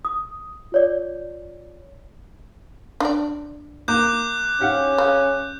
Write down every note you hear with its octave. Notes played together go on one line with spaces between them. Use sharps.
D#6
F4 C#5 D5
D4 D5
A#3 D6 F#6 G6
C#4 G4 F5 F#5
C#3